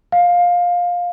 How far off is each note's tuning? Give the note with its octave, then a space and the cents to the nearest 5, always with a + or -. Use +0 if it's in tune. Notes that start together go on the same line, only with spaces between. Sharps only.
F5 +15